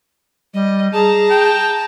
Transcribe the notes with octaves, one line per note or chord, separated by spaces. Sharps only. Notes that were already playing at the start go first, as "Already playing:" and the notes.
G3 D#5
G#4 A5 A#5
G5